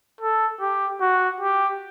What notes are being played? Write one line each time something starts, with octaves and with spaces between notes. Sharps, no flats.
A4
G4
F#4
G4